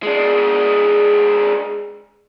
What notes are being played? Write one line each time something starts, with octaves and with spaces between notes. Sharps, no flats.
G#3 D4